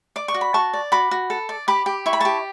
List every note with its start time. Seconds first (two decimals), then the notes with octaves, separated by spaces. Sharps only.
0.16 D5 D6
0.28 C#6
0.34 F#4
0.41 B5
0.54 F#4 A5 C#6
0.74 D5
0.92 F#4 B5 D6
1.11 F#4
1.30 A4
1.49 D5
1.68 G4 B5 D6
1.86 G4
2.06 E4 C#6
2.13 B5
2.20 G4 A5 C#6